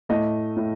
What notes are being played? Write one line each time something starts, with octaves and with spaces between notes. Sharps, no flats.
A2 A3 D#5
A2